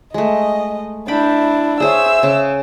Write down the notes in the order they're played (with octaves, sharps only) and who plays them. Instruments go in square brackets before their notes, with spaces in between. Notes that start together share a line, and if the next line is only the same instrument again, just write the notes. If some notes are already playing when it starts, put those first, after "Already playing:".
[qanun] G#3 A3 [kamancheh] D#5
[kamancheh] D4 E4 [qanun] G5 B5
[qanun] G#4 C5 C#5 [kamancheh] E5 E6
[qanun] C#3